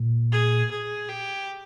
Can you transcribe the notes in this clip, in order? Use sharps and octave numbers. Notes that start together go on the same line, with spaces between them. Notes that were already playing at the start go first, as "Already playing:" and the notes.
Already playing: A#2
G#4
G#4
G4